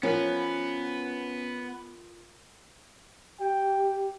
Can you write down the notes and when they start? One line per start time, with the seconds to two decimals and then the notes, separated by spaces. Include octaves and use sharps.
0.03 F3 B3 C#4 A#4 B4
3.40 G4 G5